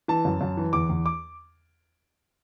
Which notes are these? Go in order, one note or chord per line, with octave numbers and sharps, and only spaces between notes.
E3 A5
F#2
F#2
E3
E2 D6
E2
D6